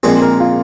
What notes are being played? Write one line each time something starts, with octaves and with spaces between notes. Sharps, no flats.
A#1 A#2 G#3 C4 G#4
A#4
F4